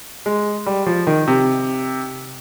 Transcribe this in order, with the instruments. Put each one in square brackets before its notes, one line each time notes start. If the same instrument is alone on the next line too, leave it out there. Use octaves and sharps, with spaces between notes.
[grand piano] G#3
G3
F3
D#3
C3